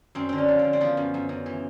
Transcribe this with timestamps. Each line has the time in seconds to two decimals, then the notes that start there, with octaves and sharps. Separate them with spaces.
0.15 F#2 C4
0.29 D3 C4
0.38 C#4
0.48 F3
0.59 D3 C4
0.73 C4
0.81 F3 B3
0.97 F#2
1.14 F#2
1.29 F#2
1.46 E3